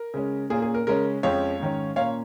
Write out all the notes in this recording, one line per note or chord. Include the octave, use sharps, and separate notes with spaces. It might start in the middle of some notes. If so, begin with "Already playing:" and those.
Already playing: A#4
C#3 G#3 C#4
A#2 A#3 C#4 G#4
G#4
A#4
C#3 G#3 C#4 A#4
F2 F3 G#3 C#4 C#5 F5
G#2 D#3 C#4
A#2 A#3 C#4 C#5 F5